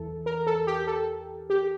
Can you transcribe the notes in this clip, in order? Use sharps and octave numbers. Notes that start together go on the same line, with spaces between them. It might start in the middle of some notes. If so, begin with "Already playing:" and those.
Already playing: E2 E3 A4
A#4
A4
G4
A4
G4